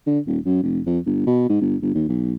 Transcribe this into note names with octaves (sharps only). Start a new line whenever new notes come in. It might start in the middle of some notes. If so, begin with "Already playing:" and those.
D3
D#1
F#2
F1
F2
G1
B2
G#2
G1
G1
D#2
B1